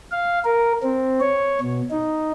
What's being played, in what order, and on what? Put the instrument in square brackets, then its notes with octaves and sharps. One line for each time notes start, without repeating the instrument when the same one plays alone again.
[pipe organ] F5
A#4
C4
C#5
B2
D#4